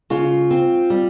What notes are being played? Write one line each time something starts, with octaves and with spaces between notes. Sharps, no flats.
C#3 F4
C4
G3